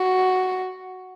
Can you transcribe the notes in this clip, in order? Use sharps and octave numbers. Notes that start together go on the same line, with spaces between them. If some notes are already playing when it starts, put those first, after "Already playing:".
Already playing: F#4